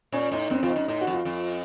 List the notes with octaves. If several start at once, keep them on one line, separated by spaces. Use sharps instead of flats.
A#2 C#4
A2 D#4
F#2 C4
F2 F4
D#4
F#2
A2 D#4
F#4
F2
F4
F2